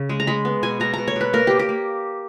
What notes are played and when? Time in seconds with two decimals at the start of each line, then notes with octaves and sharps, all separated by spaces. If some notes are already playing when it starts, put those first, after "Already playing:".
Already playing: C#3
0.09 G#3
0.20 A#5
0.27 G#3 B5
0.45 B3
0.63 B2 G#5
0.80 B2 A#5
0.93 B2 A#5
1.08 C#5
1.16 B2 B4
1.33 A#3 A#4
1.47 A#3 G4
1.59 G4
1.69 A#3